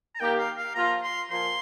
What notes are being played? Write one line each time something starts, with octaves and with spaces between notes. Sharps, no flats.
A#5
D#3 A#3 G4 G5
F5
F5
F3 A#3 F4 A#5
C6
A#2 F3 C6